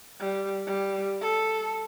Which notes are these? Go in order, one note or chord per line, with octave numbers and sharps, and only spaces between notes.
G3
G3
A4